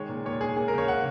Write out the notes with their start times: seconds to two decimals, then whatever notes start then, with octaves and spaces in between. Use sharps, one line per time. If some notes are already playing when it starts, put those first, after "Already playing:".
Already playing: D#3 G#3 C#5
0.09 A#2
0.25 A#2 C#5
0.41 G#3 G#4
0.57 A#3 G#4
0.68 A#4
0.74 C#3 C#5
0.88 C#3 F#5